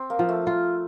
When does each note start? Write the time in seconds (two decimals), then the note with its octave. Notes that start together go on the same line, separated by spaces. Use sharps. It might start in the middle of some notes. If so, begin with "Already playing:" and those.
Already playing: C4
0.10 A#3
0.19 F3
0.29 A3
0.47 F4